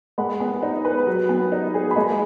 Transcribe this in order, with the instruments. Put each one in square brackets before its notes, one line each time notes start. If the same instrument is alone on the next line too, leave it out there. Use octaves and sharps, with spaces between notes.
[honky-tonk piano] G#3 [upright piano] F#5 B5
[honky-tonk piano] B3
D#4
B4
F#3
B3
D#4
G#4
[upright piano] B5
[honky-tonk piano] G#3 [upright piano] D#5 G#5